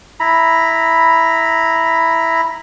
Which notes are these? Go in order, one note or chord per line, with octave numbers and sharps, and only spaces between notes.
E4 A#5 B5